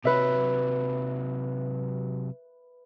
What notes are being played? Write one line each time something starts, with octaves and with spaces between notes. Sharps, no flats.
C3 F#3 B4 E5